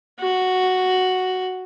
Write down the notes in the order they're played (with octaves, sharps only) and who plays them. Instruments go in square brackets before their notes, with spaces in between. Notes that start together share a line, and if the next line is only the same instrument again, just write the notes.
[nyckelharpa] F#4